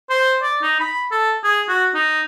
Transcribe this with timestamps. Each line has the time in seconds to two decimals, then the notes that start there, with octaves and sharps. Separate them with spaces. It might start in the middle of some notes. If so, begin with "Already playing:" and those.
0.10 C5
0.42 D5
0.62 D#4
0.80 B5
1.11 A4
1.44 G#4
1.69 F#4
1.94 D#4